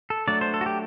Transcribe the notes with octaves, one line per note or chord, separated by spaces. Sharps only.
A4
F#3 A3 D4 D5
C5
A4
F#4
G4